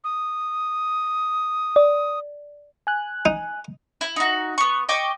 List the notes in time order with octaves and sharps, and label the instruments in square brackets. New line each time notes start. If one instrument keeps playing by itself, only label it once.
[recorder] D#6
[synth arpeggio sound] D5
[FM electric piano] G#5 F#6
[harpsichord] D#4
[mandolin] E4
D#4 F#4
B3 C#6
D#5 G5 C#6 D6